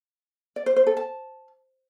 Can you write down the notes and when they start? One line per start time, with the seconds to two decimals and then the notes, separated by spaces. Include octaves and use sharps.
0.56 D5
0.66 C5
0.76 C5
0.87 A4
0.97 A5